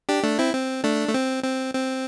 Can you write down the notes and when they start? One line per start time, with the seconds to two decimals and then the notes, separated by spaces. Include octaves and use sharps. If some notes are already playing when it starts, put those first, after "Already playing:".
0.09 D4 G4
0.24 A3 D4
0.39 C4 E4
0.54 C4
0.84 A3 D4
1.09 A3
1.14 C4
1.44 C4
1.74 C4